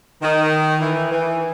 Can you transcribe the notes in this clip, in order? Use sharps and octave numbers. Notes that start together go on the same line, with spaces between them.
D#3
E3
E3